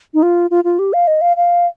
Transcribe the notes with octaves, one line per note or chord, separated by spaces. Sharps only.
D#4
F4
F4
F4
G4
F5
D#5
F5
F5